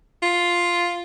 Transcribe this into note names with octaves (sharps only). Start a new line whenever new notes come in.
F4